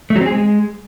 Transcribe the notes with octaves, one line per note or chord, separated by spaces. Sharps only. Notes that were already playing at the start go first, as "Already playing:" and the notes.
A3
F#3
C4
G#4
G#3